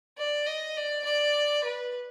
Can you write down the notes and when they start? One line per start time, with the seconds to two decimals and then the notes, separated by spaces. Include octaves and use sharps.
0.18 D5
0.47 D#5
0.77 D5
1.05 D5
1.64 B4